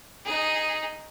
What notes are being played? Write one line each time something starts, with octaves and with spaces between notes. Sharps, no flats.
D#4 G#4